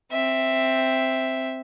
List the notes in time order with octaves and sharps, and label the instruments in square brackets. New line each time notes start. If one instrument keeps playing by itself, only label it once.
[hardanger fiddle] C4 E5